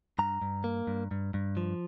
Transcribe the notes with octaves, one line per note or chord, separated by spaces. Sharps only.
G2 A#5
G2
A#3
G2
G2
G2
F3